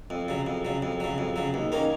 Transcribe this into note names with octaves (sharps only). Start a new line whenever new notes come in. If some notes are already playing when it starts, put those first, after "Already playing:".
F2
C#3 F#3
F2
C#3 F#3
F2
C#3 F#3
F2
C#3 F#3
D#2
D#3 A#3 C#4